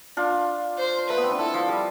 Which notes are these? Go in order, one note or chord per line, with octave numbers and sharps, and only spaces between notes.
D4 F4
C5
A3 B4
B3
C4
D4
E4 A4
F3
G3